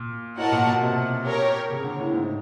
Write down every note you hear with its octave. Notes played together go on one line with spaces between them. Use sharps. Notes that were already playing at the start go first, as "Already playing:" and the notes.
Already playing: A#2
A2 F#4 A#4 D#5 F#5 A5
A#2
B2
C3
G4 A#4 C#5
C#3
D3
A2
G#2